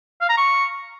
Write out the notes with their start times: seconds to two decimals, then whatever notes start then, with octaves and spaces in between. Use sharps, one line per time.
0.21 F5
0.29 A#5
0.37 C#6